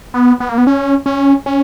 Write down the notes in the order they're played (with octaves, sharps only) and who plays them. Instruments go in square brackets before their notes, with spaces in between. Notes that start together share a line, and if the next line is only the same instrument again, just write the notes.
[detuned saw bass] B3
B3
A#3
B3
C#4
C#4
C#4